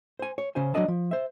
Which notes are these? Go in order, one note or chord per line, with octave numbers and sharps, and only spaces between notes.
C5 G#5
C#5
C#3 C#4 C5 G#5
F#3 C#4 D4 D5 D#5 A5
F3
C5 E5